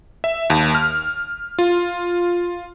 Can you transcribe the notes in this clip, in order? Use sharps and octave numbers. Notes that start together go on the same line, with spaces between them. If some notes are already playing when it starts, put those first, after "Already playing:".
E5
D#2
F6
F4